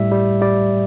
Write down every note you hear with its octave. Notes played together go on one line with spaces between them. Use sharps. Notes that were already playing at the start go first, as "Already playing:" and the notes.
Already playing: A2 G3 E5
G3
G3 D5